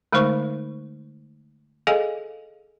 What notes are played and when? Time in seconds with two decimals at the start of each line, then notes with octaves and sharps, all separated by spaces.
0.13 D3 G#3 A3 D#4 C5 C#6
1.87 G#4 A4 D#5 F5 G#5